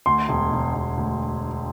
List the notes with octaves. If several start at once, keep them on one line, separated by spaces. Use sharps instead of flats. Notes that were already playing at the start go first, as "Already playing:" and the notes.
D2 C6
E1
E1
E1
D2